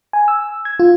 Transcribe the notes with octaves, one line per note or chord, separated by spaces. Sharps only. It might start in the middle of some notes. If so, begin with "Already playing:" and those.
G#5
E6
G#6
F4